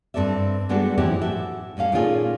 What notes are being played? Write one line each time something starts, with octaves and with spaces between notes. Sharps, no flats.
G2 C4 A4 D5 E5
G3 G#3 B3 D4 F#4 A4
A2 E3 F3 C4 E4 G4
F#4 A4 E5
A2 G3 C#4 F5
A#2 D#3 A3 C#4 F4 G#4